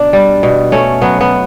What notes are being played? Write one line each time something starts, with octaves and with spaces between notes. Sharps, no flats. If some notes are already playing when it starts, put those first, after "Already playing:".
Already playing: B2 D4
G3
B2
A3 C#4
F#3 B3
B3